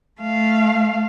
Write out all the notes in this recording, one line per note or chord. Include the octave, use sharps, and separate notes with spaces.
A3 F5